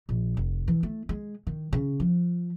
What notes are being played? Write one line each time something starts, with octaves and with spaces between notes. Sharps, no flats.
A#1
F1
E3
A3
G#3
D#3
C#3
F3